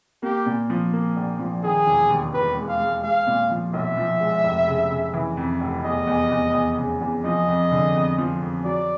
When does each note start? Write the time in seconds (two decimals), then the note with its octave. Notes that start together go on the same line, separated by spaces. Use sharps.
0.23 A#3 G4
0.46 A#2
0.70 F3
0.93 A#3
1.17 A#1
1.39 F3
1.63 D#3 G#4
1.87 E1
2.10 D#2
2.34 E1 B4
2.56 G#3
2.68 F5
2.80 G#3
3.03 G#3 F5
3.27 A#2
3.50 F3
3.73 B1 E5
3.97 F3
4.20 G#3
4.44 F1
4.68 C#3
4.91 C#3
5.14 E3
5.37 F2
5.61 F1
5.84 E2 D#5
6.07 E2
6.31 E2
6.54 E2
6.78 C#3
7.01 E2
7.24 F3 D#5
7.48 F2
7.71 D3
7.95 F2
8.18 F3
8.42 F2
8.65 F#3 D5